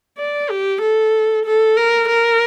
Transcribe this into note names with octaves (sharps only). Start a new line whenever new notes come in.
D5
G4
A4
A4
A#4
A#4